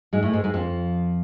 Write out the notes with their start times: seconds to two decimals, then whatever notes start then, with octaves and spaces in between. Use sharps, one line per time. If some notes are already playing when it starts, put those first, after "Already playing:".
0.13 G#2 G#3
0.23 A2 A3
0.33 G#2 G#3
0.44 G#2 G#3
0.54 F2 F3